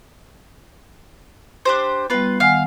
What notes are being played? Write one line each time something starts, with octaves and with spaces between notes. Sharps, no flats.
D4 G4 C5
G3 B3 F4 B4
D#3 F5 F#5 G#5